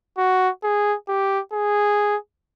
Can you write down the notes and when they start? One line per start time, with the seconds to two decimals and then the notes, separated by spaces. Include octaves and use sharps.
0.18 F#4
0.64 G#4
1.08 G4
1.53 G#4